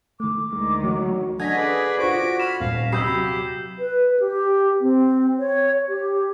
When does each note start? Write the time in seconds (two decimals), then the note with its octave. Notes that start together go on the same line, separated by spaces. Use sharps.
0.20 D#3 A3 D6
0.53 D2 D#3 G#3
0.83 E3 F#3 A3
1.40 D3 C#4 D#5 G#5 G#6 A#6 B6
1.56 G#4 B4 D5
1.99 F4 F#4 C5 D6
2.40 B5 F6 E7
2.60 D#1 F5
2.93 C3 F#3 G4 B5 D#6 E6 G6 C7
3.79 B4
4.20 G4
4.81 C4
5.39 C#5
5.89 G4